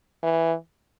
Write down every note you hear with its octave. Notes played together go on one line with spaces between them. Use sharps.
E3